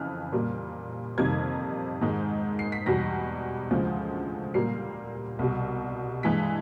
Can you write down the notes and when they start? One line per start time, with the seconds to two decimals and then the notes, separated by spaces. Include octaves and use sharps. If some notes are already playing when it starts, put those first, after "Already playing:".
Already playing: F2 C#3 E3 F6 F#6
0.32 A#2 G3 A#3
1.18 F2 C3 D#3 G3 A#3 G#6
2.01 G#2 D#3 G#3
2.59 C7
2.72 B6
2.86 E2 B2 G3 A#6
3.71 D2 C#3 F3 G#3
4.54 A#2 G3 A#3 C7
5.39 C2 B2 G3
6.23 G2 E3 G#3 B6